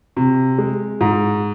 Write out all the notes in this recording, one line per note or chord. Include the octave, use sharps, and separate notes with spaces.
C3
G#3
G#2